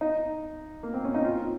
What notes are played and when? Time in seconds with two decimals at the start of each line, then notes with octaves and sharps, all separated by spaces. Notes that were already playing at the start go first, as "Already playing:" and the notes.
0.01 D#4
0.83 A#3
0.94 C4
1.04 C#4
1.14 D#4
1.25 F4